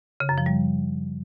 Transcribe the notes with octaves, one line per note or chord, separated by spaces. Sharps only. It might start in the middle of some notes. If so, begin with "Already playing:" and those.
C#3
F#2
F3
G3